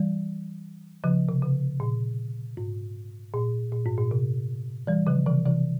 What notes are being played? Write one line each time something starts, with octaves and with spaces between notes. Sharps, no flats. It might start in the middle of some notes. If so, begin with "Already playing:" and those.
Already playing: E3 G3
C#3 F3
C3
C#3
A#2
G#2
A#2
A#2
G#2
A#2
C3
E3 G3
C#3 F3
C3 E3
C3 E3